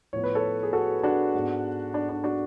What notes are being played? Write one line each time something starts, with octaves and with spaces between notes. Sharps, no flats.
A2 F3 B3 C#5
B4
A4 C#5
G#4
F#4 A4
D4 F#4
G#2 G#3 B3
D4
D4
D4 F#4